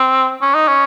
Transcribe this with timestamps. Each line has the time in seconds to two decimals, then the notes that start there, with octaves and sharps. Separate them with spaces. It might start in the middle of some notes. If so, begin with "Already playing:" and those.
Already playing: C4
0.42 C#4
0.55 D#4
0.68 C#4